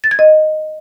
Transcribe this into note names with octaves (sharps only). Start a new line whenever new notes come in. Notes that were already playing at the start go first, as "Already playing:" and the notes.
A6
G#6
D#5